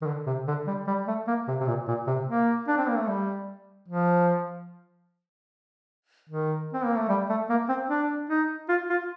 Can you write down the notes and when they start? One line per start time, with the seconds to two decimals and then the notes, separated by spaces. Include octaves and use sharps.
0.02 D#3
0.07 D3
0.27 C3
0.48 D3
0.67 G3
0.87 G3
1.08 A3
1.28 A#3
1.48 C3
1.61 C3
1.67 A#2
1.88 A#2
2.07 C3
2.28 A#3
2.68 D4
2.78 C4
2.89 A#3
2.97 A3
3.07 G3
3.89 F3
6.29 D#3
6.73 C4
6.85 A#3
6.97 A3
7.09 G3
7.30 A3
7.50 A#3
7.69 C4
7.90 D4
8.30 D#4
8.69 F4
8.90 F4